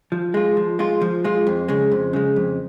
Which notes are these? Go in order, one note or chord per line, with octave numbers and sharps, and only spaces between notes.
F3
G#3 F4
F3
G#3 F4
F3
G#3 F4
F2
C#3 G#3
F2
C#3 G#3
F2